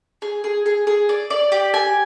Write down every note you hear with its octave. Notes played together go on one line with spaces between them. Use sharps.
G#4
G#4
G#4
G#4
D5
D5
G4
G#5